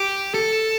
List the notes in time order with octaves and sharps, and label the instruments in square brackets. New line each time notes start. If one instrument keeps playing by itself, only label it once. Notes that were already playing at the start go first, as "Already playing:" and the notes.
Already playing: [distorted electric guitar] G4
A4